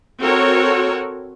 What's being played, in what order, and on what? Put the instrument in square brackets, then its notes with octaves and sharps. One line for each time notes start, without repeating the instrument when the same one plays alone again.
[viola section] C4 F#4 A4 A#4 C#5